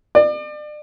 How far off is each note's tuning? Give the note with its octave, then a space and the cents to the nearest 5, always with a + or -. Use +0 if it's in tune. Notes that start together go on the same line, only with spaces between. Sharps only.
D5 +35